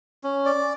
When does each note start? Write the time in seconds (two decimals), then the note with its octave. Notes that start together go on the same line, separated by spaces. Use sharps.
0.24 C#4
0.45 D5